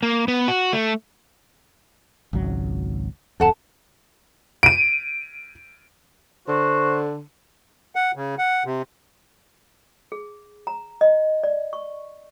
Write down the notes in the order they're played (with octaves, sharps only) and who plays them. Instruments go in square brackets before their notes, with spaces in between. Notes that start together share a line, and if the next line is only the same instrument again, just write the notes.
[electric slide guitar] A#3
B3
F#4
A3
[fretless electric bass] G#1 C#2 F#3
[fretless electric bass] D1 F2 [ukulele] A4 F#5 A5
[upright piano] D7 D#7
[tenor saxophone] D3 [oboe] F#4 [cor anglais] C5
[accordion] F#5
C#3
F#5
C3
[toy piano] G#4
A#5
D#5
D5
C#6